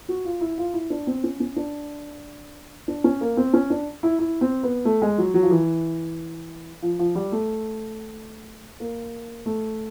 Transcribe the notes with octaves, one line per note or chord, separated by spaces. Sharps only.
F#4
F4
E4
F4
E4
D4
C4
C#4
C#4
D4
D4
C#4
A#3
C4
C#4
D4
E4
E4
C4
B3
A3
G#3
F#3
F#3
F3
E3
F3
F3
G3
A3
A#3
A3